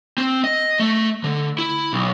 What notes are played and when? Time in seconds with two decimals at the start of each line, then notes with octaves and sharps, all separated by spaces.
0.18 C4
0.44 D#5
0.80 A3
1.24 D3
1.59 E4
1.93 B1